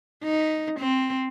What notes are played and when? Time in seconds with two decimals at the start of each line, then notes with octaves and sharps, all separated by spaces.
0.24 D#4
0.80 C4